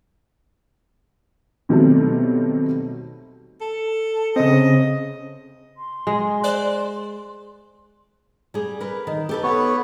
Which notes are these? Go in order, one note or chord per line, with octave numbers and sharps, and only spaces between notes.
B2 D#3 F#3 G3 A3 C4
A4
C#3 C4 D#5
C6
G#3
C5 D5 F#6
G3 G#4
A#4 B4
D#3
G4 A4 B4
B3 C#5